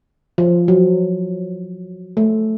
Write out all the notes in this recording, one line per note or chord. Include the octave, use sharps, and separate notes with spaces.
F3
F#3
A3